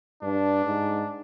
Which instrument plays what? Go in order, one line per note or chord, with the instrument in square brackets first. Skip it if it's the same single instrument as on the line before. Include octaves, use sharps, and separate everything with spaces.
[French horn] G2 [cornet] D4
[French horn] G#2